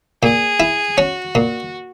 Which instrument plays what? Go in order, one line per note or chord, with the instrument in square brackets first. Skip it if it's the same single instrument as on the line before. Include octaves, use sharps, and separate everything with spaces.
[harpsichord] A#2 [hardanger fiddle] G#4
[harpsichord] E4
[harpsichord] C#4 [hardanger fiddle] F#4
[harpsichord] A#2